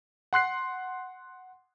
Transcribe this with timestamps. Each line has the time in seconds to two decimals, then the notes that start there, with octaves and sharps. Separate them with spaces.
0.33 F#5 C6 F#6 C7